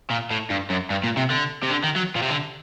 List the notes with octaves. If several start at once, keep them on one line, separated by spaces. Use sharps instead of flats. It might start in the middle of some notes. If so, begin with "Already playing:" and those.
A#2
A2
G2
F#2
G2
A#2
C3
D3
C3
D3
D#3
F#3
A#2
C3
D3